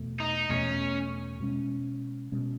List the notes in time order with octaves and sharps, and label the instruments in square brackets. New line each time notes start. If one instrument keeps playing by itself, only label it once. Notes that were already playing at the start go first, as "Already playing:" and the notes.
Already playing: [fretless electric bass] E2 B2 A3
[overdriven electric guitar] D#4
[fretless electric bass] E2 B2 A3 [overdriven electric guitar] C#4
[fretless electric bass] B2 G#3 C#4
B2 G#3 C#4